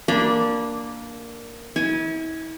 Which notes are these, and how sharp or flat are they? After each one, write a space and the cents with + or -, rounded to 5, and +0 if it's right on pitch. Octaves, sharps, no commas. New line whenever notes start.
A#3 +0 D4 +0 B5 -35
E4 -40 G#5 +0